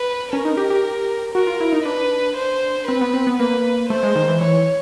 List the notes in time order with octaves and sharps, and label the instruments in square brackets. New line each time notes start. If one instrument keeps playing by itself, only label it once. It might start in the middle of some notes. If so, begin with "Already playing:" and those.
Already playing: [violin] B4
[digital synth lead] C#4 [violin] A#4
[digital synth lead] D#4
G4
G4
[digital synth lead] F#4 [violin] A#4
[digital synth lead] F4
E4
D#4
[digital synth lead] D4 [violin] B4
[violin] C5
[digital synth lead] C4 [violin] B4
[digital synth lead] B3
C4
B3
[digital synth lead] A#3 [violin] B4
[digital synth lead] A3 [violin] C5
[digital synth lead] G#3
D#3
E3
[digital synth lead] E3 [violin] C#5